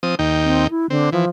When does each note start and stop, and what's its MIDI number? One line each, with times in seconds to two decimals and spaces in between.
0.03 0.15 53
0.03 0.15 60
0.03 0.15 87
0.19 0.67 39
0.19 0.67 63
0.19 0.67 79
0.45 0.65 60
0.70 0.86 64
0.90 1.09 50
0.90 1.10 60
1.13 1.25 52
1.13 1.29 53